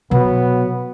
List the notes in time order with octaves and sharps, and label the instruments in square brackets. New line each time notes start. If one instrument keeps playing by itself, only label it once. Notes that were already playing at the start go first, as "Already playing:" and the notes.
[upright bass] B2 [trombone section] F#3 B3